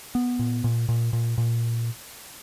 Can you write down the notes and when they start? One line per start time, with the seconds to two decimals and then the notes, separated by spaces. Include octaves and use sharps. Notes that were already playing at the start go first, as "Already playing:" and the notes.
0.15 B3
0.39 A#2
0.64 A#2
0.89 A#2
1.13 A#2
1.38 A#2